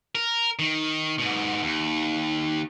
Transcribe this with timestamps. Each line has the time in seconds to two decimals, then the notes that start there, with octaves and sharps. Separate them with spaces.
0.15 A#4
0.59 D#3
1.18 G#2 B2
1.63 D#2